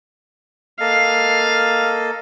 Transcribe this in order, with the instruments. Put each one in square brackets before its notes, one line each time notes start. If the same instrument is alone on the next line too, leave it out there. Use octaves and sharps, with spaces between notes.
[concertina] A#3 A4 D#5 [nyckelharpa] F5